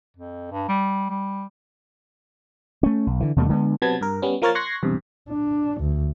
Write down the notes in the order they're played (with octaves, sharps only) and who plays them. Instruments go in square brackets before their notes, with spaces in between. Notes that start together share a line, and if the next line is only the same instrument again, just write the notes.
[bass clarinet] F2
G2
G3
G3
[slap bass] A3 C#4
B1
D3 E3
D#2 B2 G3 A3
D3 G#3 A#3 B3
[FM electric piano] C3 F#3 B3 A5 G#6
G2 A#4
G3 B3 C#4
F3 A#3 A#4 C#5 F6 A6
C6 C#6 F#6 G#6 A#6 C7
B1 E2 G2 C3
[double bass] D4
D2